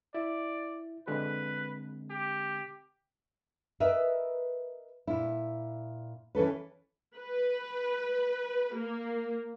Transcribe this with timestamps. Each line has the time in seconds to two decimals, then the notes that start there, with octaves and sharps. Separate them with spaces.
0.14 E4 D5
1.08 D3 G#3 C4 B4
2.11 G4
3.80 A#4 B4 D#5 E5
5.07 A#2 E4
6.35 E3 C#4 A4 B4
7.17 B4
8.74 A#3